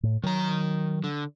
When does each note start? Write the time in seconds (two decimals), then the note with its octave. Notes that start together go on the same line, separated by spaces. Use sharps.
0.03 A2
0.23 D#3 F#3 A#5
1.04 D3